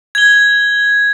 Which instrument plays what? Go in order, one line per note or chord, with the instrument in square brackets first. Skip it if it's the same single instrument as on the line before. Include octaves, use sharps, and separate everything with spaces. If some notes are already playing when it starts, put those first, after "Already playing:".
[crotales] G#6 G7